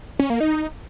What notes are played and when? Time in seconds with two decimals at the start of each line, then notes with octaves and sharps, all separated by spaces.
0.19 C#4
0.30 A#3
0.40 D#4